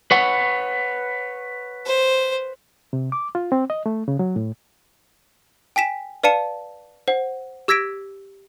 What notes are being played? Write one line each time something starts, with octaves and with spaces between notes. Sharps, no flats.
B4 C#5 F#5
C5
C3
D6
F4
C4
D#5
A3
C#3
F#3
A2
G5 G#5 B6 E7
B4 D5 F5 A5 C#7 E7
C5 F#5
G4 E6 G#6 A#6 B6 D7